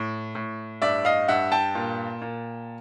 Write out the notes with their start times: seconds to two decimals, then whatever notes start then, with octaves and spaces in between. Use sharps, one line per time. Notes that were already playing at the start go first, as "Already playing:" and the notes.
Already playing: A2
0.35 A2
0.82 G2 D5 E5
1.05 D#5 F5
1.28 G2 E5 F#5
1.52 G5 A5
1.75 A#2
2.22 A#2